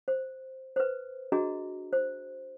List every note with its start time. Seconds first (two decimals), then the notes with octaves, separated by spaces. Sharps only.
0.08 C5
0.76 B4 C5
1.32 D4 F#4 G#4 D#5 A#5
1.93 C5